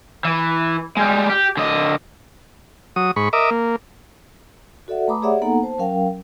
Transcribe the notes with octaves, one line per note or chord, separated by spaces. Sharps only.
E3
G3 G#3
G4
D3 D#5
F#3 D#6
G#2 B5 C#6
A#4 D#5 E5 D6
A#3
F#4 A4 D5 E5 F#5
A3 B4 A#5 B5 D6 D#6
G4 G#4 C#5 D5 E5 F#5
A#3 B3 D#4 A4 F#5 A#5
C5 A5
F#3 C#4 A#4 F5 G5